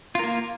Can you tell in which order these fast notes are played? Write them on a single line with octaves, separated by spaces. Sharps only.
F4 A#4 A#3